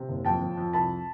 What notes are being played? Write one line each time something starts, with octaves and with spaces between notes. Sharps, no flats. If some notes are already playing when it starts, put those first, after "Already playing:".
Already playing: C3
F#1
F2 G5 A5
F2
F2
C2 A5 B5